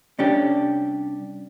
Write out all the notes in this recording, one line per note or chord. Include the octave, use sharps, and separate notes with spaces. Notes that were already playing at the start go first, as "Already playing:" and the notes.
C2 C#4 D4 G4